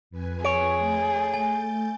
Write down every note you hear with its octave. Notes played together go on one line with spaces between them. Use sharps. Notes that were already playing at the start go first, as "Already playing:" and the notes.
F2 B4 G#5
G#4 C#5 D7
A3 G6 A6
G#5